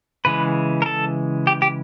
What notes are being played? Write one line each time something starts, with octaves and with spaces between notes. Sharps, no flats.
C#3 E3 G#3 B4
A#4
A4
G4
G4